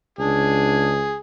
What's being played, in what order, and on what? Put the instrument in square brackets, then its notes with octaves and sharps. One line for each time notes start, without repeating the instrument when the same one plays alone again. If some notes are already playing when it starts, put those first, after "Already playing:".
[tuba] C#2 [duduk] D4 [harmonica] G#4